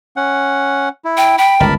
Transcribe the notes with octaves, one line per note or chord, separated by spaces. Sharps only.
C#4 F#5
E4
G5
G5 B5
G1 C#2 A#4 A5 B5